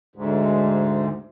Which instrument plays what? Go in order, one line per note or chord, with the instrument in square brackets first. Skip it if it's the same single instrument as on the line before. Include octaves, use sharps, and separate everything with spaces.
[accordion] D2 G#2